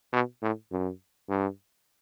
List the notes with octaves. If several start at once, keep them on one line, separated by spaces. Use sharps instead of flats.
B2
A2
F#2
G2